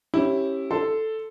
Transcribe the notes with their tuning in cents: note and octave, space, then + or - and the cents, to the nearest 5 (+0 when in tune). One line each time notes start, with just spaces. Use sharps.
C#4 -25 E4 +0 G4 +0
A4 +0 C6 -10